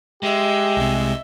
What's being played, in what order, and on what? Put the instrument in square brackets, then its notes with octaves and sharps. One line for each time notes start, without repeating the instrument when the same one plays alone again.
[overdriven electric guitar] G#3 [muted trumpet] G4 [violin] D#5 E5
[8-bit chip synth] C2 C3